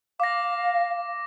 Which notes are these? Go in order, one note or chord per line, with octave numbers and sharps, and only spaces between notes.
F5 D6 A#6